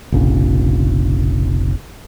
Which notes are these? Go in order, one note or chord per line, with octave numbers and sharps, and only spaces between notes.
F1 A#1 C#3